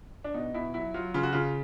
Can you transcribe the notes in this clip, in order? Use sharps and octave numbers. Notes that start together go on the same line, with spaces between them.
D4
B2 D#4
B2 E4
F#3 E4
F#3 F4
C#3 F4
F#4
C#3 F4